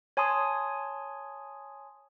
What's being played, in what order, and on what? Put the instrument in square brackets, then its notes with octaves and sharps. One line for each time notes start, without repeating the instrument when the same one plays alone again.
[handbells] C#5 G#5 A5 C6 D#6